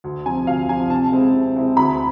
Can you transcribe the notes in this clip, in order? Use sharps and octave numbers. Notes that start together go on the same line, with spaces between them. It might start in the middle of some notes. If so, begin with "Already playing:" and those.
D2
C3 F3 G#5
D2 F5
C3 F3 G#5
C3 A5
G#3 C4 E4
C3
G#3 C4 E4
D2 B5